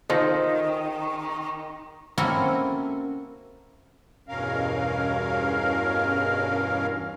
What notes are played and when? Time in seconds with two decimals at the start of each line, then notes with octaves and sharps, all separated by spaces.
0.10 D#3 D#4 F4 A4 C5
2.18 A#3 C4 C#4 E4 F#4 A4
4.28 E2 G2 B2 C#4 A#4 F5